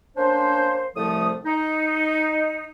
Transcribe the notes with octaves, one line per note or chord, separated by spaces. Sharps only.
A#3 C#4 D4 C5
C2 A2 F3 A3 A4 D#6
D#4